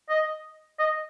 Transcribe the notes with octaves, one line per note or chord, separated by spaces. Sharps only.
D#5
D#5